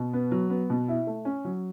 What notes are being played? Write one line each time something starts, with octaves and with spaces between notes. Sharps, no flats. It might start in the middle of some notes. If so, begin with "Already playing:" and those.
Already playing: B2
B3
F#3
B3
B2
E4
A3
C#4
F#3